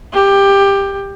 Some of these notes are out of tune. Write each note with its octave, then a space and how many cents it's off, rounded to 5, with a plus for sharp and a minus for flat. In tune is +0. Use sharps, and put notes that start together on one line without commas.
G4 +15